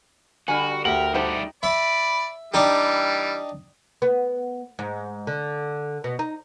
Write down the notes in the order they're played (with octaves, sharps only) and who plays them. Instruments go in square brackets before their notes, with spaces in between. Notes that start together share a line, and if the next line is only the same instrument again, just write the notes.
[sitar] D3 G3 [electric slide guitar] F#4 [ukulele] G#5
[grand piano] D2 F#7 [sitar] G4 [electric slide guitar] A#4 [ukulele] F#5
[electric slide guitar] G3 A3 D4 [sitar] D#4 [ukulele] G4 C5 F#5
[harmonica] D5 B5 [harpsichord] E5
[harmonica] E3 G3 [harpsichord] D4 D#4 G4
[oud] B3
G#2
D3
B2
D#4